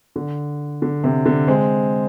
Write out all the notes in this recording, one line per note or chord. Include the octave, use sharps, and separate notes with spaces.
D3
D3
C3
D3
G#3 C4